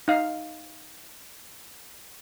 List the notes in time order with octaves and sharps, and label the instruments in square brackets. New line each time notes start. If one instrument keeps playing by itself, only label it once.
[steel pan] D#4 F5